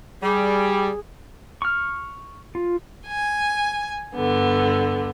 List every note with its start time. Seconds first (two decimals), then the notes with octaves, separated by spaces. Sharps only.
0.23 G3 G#4
1.62 C#6 F6
2.55 F4
3.06 G#5
4.14 G2 D3 B3